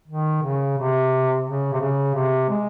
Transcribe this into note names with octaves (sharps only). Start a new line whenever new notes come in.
D#3
C#3
C3
C#3
C3
C#3
C3
G#3